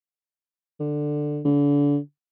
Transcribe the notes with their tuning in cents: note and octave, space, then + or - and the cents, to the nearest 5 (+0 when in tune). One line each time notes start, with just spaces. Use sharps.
D3 +10
D3 -35